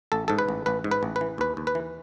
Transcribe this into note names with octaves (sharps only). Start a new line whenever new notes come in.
A1 A4
G#2 A4
B4
A1
A1 B4
G#2
B4
A1
B4
E3
D#2 B4
D#2
B4
E3